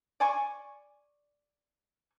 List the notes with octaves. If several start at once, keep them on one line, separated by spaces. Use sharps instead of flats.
D5 G#5 C#6